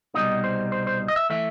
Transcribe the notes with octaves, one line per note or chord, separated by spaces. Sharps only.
C2 B2 G3 D#4 D#5
C5
C5
C5
D#5
E5
E3 A3 E5